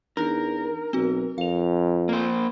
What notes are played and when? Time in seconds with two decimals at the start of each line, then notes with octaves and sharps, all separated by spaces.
0.17 E2 D4 D#4 A#4
0.93 B1 C4 F#4
1.38 F2 F5 F7
2.09 A#3 C5